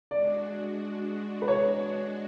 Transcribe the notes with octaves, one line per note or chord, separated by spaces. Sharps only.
G#3 D4 F#4 D5
B4
C#5